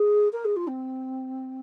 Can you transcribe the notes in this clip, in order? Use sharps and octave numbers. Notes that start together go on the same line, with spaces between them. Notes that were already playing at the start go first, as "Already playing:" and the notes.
Already playing: G#4
A#4
G#4
F4
C4